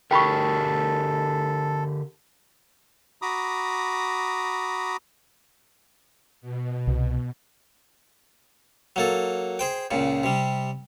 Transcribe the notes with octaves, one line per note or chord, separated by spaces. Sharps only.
D3 G4 A4 A#4 G5 B5 C#6
F#4 A#5 B5 D6 D#6
B2
C2
F#3 A#3 A4
G#4 C5 G5
C#2 A#2 C#3
C3 G3